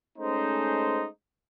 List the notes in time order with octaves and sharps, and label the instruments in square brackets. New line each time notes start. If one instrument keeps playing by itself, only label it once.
[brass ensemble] G#3 A3 C#4 D#4 C5